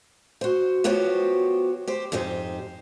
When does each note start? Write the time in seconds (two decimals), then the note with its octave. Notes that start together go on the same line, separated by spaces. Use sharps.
0.41 F#4 C5
0.84 F3 B3 F#4 G4 C5 C#5
1.87 G4 C5
2.12 F2 G#2 D#4 G4 C5